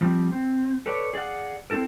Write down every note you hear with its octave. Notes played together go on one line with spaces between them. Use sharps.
F3 G3 C4
C4
A4 B4 C#5 D5
G#4 D5 F5 F#5
C4 C#4 E4 A4 A#4